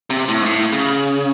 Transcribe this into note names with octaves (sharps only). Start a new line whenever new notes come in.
C3
A2
G#2
A2
C#3